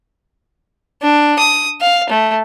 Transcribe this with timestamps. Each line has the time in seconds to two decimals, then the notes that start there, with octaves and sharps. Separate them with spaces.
1.02 D4
1.39 D#6
1.81 F5
2.10 A3